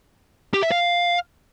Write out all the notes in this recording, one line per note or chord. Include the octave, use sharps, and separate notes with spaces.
G4
E5
F5